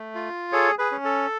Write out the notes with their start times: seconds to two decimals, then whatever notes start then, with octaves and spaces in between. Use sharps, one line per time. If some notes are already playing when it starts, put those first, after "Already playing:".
Already playing: A3
0.15 F4
0.52 G#4 A4 C#5
0.79 G#4 B4
0.91 C#4
1.05 A4